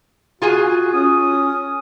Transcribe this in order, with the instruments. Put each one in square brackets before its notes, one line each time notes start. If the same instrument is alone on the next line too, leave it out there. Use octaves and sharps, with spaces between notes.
[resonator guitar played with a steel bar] F4 G#4 G#5 [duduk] F#4
[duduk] C#4 [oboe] D#6